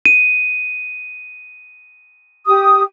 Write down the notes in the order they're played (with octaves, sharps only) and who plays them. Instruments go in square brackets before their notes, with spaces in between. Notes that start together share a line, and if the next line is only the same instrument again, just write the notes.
[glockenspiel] D#7
[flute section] G4 D#6